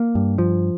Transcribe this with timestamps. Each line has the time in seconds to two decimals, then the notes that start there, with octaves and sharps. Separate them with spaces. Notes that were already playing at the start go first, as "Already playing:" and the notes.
Already playing: A#3
0.15 G2
0.38 F3